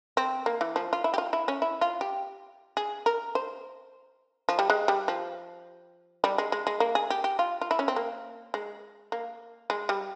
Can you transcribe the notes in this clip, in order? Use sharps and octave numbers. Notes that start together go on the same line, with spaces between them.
C4
A#3
E3
F3
F4
E4
G4
F4
E4
C#4
E4
F4
G4
G#4
A#4
C5
F3
G3
G#3
G3
F3
G3
G#3
G#3
G#3
A#3
G#4
G4
G4
F4
F4
E4
C#4
C4
A#3
G#3
A#3
G#3
G3